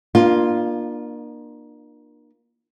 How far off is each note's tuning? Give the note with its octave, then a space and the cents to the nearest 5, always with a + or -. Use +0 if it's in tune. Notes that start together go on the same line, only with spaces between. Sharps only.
A#3 +25 D4 +40 F4 +0